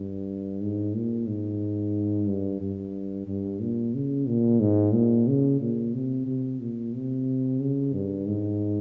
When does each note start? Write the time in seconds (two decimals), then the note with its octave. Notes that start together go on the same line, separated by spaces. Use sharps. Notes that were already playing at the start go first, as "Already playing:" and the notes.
Already playing: G2
0.61 G#2
0.94 A#2
1.27 G#2
2.27 G2
2.61 G2
3.28 G2
3.61 A#2
3.95 C#3
4.27 A#2
4.60 G#2
4.93 A#2
5.28 C#3
5.61 A#2
5.94 C3
6.27 C3
6.60 A#2
6.94 C3
7.60 C#3
7.93 G2
8.26 G#2